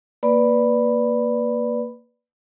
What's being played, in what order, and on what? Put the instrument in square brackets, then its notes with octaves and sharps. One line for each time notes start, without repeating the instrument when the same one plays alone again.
[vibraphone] A#3 B4 D5 B5